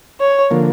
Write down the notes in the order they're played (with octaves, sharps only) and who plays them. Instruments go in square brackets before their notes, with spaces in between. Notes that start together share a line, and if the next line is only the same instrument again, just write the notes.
[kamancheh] C#5
[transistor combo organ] D3 F3 A#3